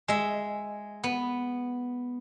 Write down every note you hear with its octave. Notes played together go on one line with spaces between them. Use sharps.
G#3 E5
B3